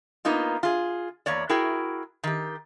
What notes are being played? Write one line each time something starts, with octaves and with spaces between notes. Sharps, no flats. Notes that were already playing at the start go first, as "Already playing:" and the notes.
A#3 B3 D#4 F4
F4 G#4
E2 A#3 C#5 D5
E4 F#4 G#4 A#4 G5
D#3 G4